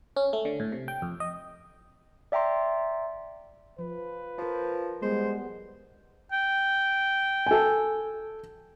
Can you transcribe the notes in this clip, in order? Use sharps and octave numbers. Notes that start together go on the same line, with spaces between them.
C#4
A3
D3
A2
C3
G5
F2
D#5
D5 E5 G5 A#5 C6
F3 B4
F3 A#4 C5
G3 G#3 B3 C5
G5
A4 G#5